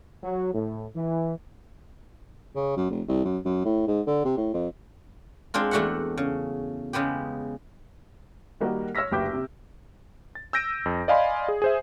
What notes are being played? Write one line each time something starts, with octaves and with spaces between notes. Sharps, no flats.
F#3
A2
E3
C#3
F#2
F1
C2
F#2
F#2
A2
G#2
D3
C3
A2
F2
G#3 C4 D4 F4
E2 A3 D4 F#4 E5 F#5
C#3
C#3 G#3 B3 G4
D#3 G3 A#3 D#4 F#4 G4
C#5 E6 F6 A#6 B6
F#1 D2 G4 B4 D6 G6
C3
A6
E6 G6 A#6 D7 D#7
F2
D5 D#5 F5 G#5 B5 C6
G#4
G#4 C5 E5